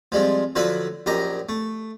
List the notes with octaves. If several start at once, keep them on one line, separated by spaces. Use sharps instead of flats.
F3 G3 G#3 C4
D3 F3 F#3 B4 E5 F#5
A#1 F#2 G4 D#5 A#5
A3